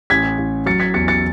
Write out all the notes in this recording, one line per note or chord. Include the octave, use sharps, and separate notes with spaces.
A1 G#6 B6
A1
F#3 A6 C#7
G#6 B6
E2 A6 C#7
A6 C#7